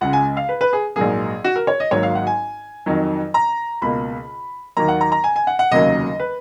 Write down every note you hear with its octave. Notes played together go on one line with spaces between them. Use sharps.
C#2 C#3 G#3 F#5
G#5
F5
B4
B4
G#4
A#1 G#2 F#3 A#3 G#4
F#4
A#4
C#5
D#5
G#1 G#2 F#3 A#3 C#5
F5
F#5
G#5
F2 D#3 F#3
A#5
C#2 B2 A#3 B5
D#2 D#3 F#3 A#3 A#5
F#5
A#5
A#5
G#5
G#5
F#5
F#5
F1 D#2 C#3 F#3 A#3 D#5
B4